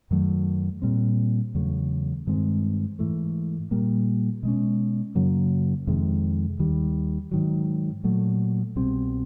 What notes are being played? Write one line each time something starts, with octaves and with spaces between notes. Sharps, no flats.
F#2 D#3 F#3 A3
A#2 G3 C4
E2 C#3 F#3 A3
G2 D#3 G#3 C4
G#2 E3 A3
A#2 G3 A#3
B2 G#3 C#4
F#2 C#3 F#3 A#3
F2 C3 D#3 G#3
D#2 D#3 G3
G#2 D#3 F#3
A#2 F#3 A3
C2 B2 G3 C4